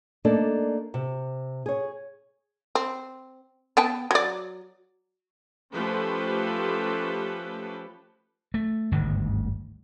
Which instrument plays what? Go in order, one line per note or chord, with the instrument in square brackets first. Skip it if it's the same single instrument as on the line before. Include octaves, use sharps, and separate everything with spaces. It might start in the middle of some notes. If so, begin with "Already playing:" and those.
[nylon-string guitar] A3 A#3 D4 D#4 A4 D5
C3
G#4 C#5
[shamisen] C4
B3 G5 A5
F#3 D5
[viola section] F3 A3 C#4 G4 A4 B4
[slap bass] A3
G1 D2 G#2 D#3